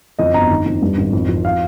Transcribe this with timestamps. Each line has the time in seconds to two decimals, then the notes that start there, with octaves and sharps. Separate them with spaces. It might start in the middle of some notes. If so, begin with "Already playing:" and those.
0.19 F2 D#5
0.34 G1 A#5
0.50 D#3
0.66 F2
0.82 G2
0.98 G#1
1.13 F2
1.29 F3
1.45 F5